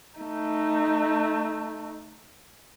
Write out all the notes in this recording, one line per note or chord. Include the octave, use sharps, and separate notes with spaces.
A3 D#4